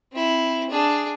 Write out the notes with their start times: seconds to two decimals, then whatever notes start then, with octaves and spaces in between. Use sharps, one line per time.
0.12 C4 E4
0.70 D4 G#4